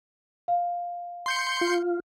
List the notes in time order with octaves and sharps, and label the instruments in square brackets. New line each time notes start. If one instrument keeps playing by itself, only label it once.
[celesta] F5
[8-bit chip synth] C6 G6 C#7
[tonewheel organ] F4